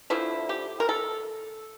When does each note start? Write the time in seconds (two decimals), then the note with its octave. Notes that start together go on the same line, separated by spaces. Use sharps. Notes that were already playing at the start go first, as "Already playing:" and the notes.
0.10 D3 F3 A3 E4
0.49 G4
0.80 A#4
0.89 A4